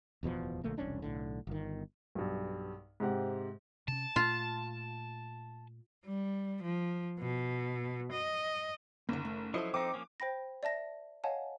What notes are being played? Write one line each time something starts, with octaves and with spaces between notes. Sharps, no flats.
D1 E2 B2 F3
A#1 D3 A3 A#3
E1 C2 C#4 D4
B1 A2 D3
G1 D#3
B1 G2
G#2 C3 C4 G4 F#5
C3 C#4 A5
A#2 A3 F4
G3
F3
B2
D#5
F#1 D3 D#3 A#3
A3
F3 F#3 E4 A4 C5 D#5
F3 C4 D#4 D6
F3 A#3 C#4
C5 G5 B5 A#6
D5 E5 A5 A#6
C#5 D#5 F5 F#5 G#5 A5